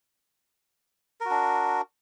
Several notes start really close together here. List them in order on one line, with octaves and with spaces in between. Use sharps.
A#4 F#4 D4